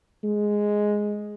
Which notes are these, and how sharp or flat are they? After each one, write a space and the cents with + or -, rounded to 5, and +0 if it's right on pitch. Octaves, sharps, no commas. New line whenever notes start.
G#3 +0